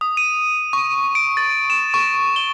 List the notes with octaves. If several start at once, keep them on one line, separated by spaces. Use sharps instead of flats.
D#6
D#7
C#6
D7
A6
E7
C#6
G7